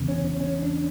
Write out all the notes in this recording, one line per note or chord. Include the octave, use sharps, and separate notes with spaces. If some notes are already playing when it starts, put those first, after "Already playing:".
Already playing: E2 C#3
C#4
C#4
C#4
D4